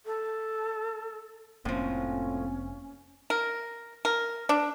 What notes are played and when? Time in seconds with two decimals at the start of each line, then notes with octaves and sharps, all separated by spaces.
0.06 A4
1.65 F1 A2 F3 A#3 C4 C#4
3.30 A#4
4.05 A#4
4.49 D4